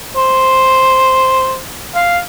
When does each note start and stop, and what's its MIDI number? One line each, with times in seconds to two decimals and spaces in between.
0.16 1.59 72
1.95 2.18 77